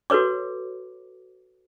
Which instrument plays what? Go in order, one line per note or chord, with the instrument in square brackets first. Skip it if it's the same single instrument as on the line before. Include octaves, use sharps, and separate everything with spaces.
[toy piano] F#4 A4 B4 C#5 D6